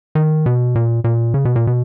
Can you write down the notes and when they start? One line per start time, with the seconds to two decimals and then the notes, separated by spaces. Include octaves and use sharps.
0.15 D#3
0.46 B2
0.75 A#2
1.04 A#2
1.34 C#3
1.45 B2
1.56 A#2
1.67 B2